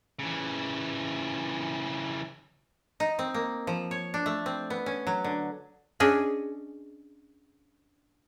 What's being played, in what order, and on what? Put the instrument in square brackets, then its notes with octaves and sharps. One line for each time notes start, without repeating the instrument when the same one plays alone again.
[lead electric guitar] C#3 E3
[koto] D#4
C4
A#3
F3
C#5
D4
A3
C4
B3
C#4
F#3
D3
C#4 D4 G#4 D#5